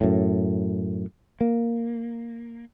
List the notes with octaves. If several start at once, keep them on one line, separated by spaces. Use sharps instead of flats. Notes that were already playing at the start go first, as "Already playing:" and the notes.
F#2 A2
A#3